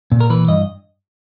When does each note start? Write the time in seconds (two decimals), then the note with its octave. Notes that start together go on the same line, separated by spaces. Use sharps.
0.12 A#2
0.21 A#4
0.30 E3 B4
0.48 G2 D#5